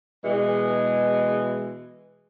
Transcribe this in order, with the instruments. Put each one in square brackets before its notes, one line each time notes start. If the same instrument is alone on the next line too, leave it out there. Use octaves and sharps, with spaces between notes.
[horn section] B2 E3 G#3